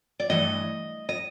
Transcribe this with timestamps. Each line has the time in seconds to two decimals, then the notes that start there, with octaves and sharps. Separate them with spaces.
0.20 D5
0.30 G2 E3 A3 D#5
1.09 D#5